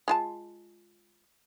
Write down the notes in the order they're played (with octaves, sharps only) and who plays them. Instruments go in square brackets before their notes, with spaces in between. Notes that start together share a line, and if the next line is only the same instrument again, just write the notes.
[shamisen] G#3 F4 A5